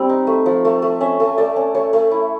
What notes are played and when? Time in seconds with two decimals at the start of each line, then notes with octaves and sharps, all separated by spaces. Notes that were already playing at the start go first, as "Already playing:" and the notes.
Already playing: G3 C4
0.09 D#4
0.27 A3
0.46 F3
0.65 A3
0.82 A3
1.00 C#4 E5
1.20 A3
1.38 A3 D5
1.56 C#4
1.75 A3 C#5
1.93 A3
2.11 E4